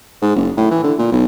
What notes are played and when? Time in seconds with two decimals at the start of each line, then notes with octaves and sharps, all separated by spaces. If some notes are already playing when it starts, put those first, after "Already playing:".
0.22 G#2
0.36 F#1
0.57 A2
0.70 E3
0.83 D3
0.99 A#2
1.12 B1